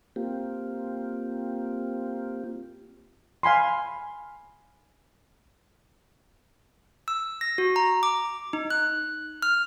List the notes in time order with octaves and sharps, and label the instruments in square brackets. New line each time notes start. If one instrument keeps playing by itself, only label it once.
[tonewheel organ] A#3 C4 F4 G4
[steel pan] F5 G#5 B5 C6
[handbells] E6
A#6
F#4
A#5
D6
D#4
F#6
F6